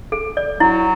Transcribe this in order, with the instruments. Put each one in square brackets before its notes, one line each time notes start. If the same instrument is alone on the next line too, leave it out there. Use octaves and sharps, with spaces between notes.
[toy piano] A4
D5
[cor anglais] F#3 [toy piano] E4